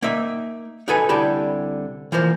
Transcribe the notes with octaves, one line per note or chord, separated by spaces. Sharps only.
A#3 D#4 E5
D#4 F#4 A4 B4 G#5
C2 D3 E4 G4 A5 B5
E3 F3 A#3 C5